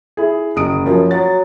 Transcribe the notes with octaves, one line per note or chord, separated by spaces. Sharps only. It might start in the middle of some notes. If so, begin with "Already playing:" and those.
E4 G#4
F#1 D#6 D7
F#2 F3
F#3 A6